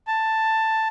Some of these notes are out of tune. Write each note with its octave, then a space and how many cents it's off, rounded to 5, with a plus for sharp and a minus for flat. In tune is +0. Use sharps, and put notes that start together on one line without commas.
A5 +10